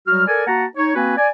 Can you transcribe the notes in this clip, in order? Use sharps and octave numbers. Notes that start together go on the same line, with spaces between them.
F#3 G3 F#4 F6
A4 A#4 D5 G#5
A#3 F#4 F#5 A5 A#5
D#4 C#5
A#3 C4 F#4 B4 G#5
D5 G#5